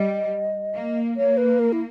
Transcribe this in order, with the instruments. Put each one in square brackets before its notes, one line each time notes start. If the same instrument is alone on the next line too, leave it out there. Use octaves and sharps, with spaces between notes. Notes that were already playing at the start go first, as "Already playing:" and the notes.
Already playing: [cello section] G3 [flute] D#5
[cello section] A#3
[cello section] A#3 [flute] C#5
[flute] B4
A#4
E4